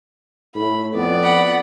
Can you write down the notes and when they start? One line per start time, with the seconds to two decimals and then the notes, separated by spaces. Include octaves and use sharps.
0.55 A2 B5
0.94 F2 B3 D5
1.23 F#5 B5